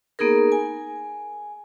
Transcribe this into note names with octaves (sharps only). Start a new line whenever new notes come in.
A#3 B3 D#4 G#4 A#4
G#5